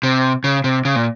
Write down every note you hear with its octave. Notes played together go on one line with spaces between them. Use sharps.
C3
C#3
C3
C#3
A#2